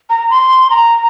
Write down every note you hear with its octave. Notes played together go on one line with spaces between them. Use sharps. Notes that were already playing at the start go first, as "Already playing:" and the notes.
A#5
C6
A#5